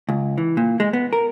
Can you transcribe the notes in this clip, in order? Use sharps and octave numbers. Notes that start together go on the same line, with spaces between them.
C#2
E3
A#2
G#3
B3
A#4